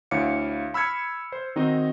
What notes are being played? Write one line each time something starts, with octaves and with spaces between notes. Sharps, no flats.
D2 E4 C#5 F5 D6 C#7
B5 E6 F6 G#6 C#7
C5
D#3 C4 D#4 F#4 D#5